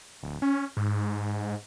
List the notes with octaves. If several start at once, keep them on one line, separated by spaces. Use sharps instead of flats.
D1
C#4
G#2